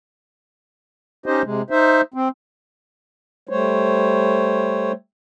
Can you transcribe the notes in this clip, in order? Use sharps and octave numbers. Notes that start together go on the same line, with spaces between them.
C#4 D#4 G4 C5 D#5
C3 G#3
D#4 C5 E5
C4
G3 A3 C5 C#5